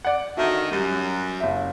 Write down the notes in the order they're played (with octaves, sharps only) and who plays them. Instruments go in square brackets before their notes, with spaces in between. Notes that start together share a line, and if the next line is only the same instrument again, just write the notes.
[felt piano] D5 F#5
[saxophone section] D3 D#3 [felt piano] F#4 E5
[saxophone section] F#2 [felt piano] G3
[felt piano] F#1 E5